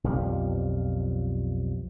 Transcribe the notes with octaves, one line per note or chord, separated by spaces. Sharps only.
B1 F2 F3 G3